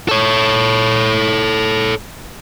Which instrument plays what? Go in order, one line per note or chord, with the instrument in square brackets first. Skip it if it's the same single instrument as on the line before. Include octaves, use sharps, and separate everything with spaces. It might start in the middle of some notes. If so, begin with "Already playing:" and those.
[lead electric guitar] A4 C#5